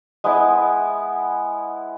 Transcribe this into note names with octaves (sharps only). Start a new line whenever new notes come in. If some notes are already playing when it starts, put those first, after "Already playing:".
G#3 B3 E4